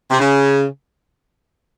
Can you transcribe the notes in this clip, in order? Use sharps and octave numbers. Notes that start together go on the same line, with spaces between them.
C3
C#3